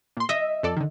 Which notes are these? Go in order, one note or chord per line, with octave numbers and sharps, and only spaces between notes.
A#2 C6
D#5 E5
F2 A4 D5
D3 D#3